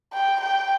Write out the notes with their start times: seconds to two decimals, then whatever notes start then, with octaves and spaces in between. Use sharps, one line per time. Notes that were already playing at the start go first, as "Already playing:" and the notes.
0.13 G5
0.41 G5